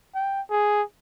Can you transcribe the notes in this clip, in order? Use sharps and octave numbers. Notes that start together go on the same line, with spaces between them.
G5
G#4